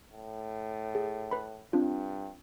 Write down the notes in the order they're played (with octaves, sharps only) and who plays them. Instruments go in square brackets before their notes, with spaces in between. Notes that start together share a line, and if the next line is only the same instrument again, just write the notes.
[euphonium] A2
[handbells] G#4
B4 B5
[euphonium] G2 [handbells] C4 D4 F4